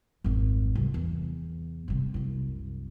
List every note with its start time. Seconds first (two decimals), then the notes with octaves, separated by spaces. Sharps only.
0.24 G#1 F2
0.75 C2 F#2
0.94 E2
1.88 G2 C3
2.14 C2 F#2